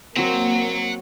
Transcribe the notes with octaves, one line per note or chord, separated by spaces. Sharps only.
F#3 A#3 C4 F#5 A#5